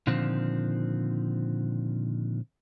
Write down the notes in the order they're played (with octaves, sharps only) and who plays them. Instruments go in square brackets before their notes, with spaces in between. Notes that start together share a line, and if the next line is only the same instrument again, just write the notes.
[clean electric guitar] A#2 D3 D#3 F3 C4